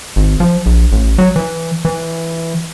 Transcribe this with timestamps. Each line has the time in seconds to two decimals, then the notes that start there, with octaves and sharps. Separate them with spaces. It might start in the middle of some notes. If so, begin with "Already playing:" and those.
0.16 G#1
0.40 F3
0.66 A#1
0.92 A1
1.18 F#3
1.36 E3
1.85 E3